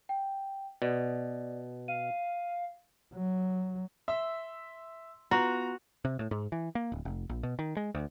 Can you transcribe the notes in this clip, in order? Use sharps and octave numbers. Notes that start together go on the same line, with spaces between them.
G5
B2 D5
F5 D#7
F#3
E5 C6 E6
B3 F4 F#4 B4 A#5
C3
A2
G#2
E3
A#3
D1
F1
A#1
B2
D#3
G#3
D2